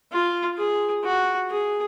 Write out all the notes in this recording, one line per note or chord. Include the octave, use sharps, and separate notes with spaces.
F4
G#4
F#4
G#4